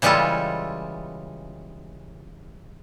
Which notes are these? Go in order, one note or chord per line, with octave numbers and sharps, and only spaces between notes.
C#3 E3 G3 G#3 F4 A4